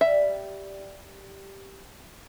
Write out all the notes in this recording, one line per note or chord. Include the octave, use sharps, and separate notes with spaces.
G3 E5